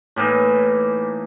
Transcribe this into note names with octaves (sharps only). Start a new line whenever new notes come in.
A2 E3 A#3 D#4